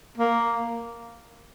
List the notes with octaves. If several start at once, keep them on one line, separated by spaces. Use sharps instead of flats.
A#3